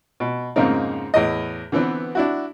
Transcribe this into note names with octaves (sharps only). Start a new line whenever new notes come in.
B2
F2 G#2 C#3 A#3 C4 D#4
E2 A2 D#5
D3 E3 B3 C4
D4 E4 F#4